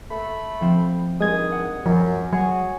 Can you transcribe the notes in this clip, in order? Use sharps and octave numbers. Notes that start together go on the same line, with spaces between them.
A3 B5
F3 C4
G2 D#3 G#3 D#6 G#6
F#5
F#2 F3
F#3 F#4 G#4 C#5